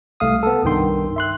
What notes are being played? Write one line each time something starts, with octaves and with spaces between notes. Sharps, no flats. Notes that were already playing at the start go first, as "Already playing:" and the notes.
C2 A3 F5 D#6
B3 A4
C2 G2 D#3 G5 C6
E5 C6 F#6